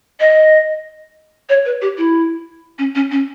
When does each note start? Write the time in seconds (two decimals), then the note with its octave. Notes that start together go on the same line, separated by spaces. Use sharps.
0.20 D#5
1.49 C#5
1.65 B4
1.82 G4
1.98 E4
2.79 C#4
2.95 C#4
3.11 C#4